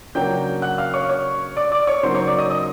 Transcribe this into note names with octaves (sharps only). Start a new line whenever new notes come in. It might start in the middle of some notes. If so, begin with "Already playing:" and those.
C#3 F#3 A#3 D4 G5 G6
F#5 F#6
F5 F6
C#5 C#6
C#5 C#6
D5 D6
D5 D6
C#5 C#6
C#3 F#3 A#3 D#4 C5 C6
C#5 C#6
D5 D6
D#5 D#6
D#5 D#6